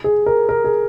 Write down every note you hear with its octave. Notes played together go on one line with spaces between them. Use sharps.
G#4
A#4
A#4
G#4